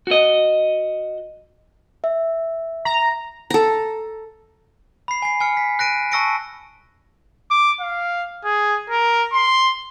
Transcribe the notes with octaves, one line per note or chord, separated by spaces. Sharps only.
F#4 D#5
E5
A#5
A4 A#5
B5 C7
G#5 C7
G#5 F6 C#7
B6
F#6 A#6 D7 D#7
A5 C#6 E6 A#6 C#7 D7
D6
F5
G#4
A#4
C6